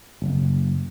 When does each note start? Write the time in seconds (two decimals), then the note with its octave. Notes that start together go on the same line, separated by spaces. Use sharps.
0.22 F#1